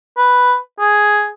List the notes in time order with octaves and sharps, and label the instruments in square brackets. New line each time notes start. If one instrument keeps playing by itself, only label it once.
[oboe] B4
G#4